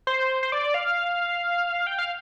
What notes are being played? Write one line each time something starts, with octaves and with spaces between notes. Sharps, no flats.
C5
C5
D5
F5
G5
F5